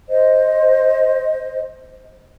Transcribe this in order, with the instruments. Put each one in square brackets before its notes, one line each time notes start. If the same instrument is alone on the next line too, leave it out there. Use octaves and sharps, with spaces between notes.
[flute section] C5 D#5